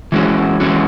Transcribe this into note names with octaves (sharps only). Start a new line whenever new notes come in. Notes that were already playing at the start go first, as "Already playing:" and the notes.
E3 G#3 C#4 F#4
E3 G#3 C#4 F#4